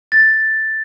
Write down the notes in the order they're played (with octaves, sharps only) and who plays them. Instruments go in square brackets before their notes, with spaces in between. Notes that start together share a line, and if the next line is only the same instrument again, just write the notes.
[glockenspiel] A6